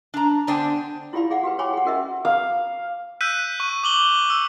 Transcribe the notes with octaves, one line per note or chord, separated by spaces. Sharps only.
D4 A#5
D3 B3 D4 C5 G5 G#5
E4 F4 G4 D5 F5 B5
G#4 D5 F5 F#5
F#4 G4 B4
G4 C#5 G5 G#5 B5 D6
G#4 F#5
C#4 F#4 A#4 D#5 E5
F5
E6 F#6 G6 B6 D#7
C#6 D#7
D6 F#7 G7
E6